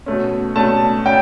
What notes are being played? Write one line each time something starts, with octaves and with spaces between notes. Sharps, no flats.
B2 A3 C#4
B2 A3 C#4 A5
C#4 G5